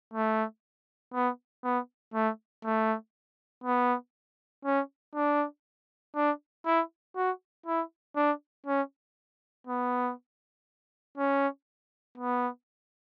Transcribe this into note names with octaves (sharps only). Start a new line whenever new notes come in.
A3
B3
B3
A3
A3
B3
C#4
D4
D4
E4
F#4
E4
D4
C#4
B3
C#4
B3